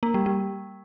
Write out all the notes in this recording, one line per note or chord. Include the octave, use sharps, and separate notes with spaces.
A#3
G3
G3